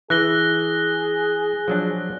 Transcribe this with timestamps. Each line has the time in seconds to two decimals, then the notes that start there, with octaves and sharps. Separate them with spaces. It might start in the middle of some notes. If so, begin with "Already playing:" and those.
0.10 E3 G#4 F#6 A#6 G7
1.68 F3 F#3 D4